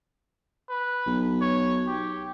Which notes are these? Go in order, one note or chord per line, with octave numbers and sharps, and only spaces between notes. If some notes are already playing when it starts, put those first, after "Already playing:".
B4
B1
C#5
G4